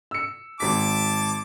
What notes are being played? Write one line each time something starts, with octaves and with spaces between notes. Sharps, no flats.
E6 C#7
G#1 A5 D6 B6